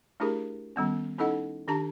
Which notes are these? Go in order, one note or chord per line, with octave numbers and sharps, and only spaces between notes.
A3 D4 E4 G4 G#4 A#4
D#3 G3 B3 C#4
C#4 D#4 E4 A4 D#5 F#5
D#3 D4 G4 A5 A#5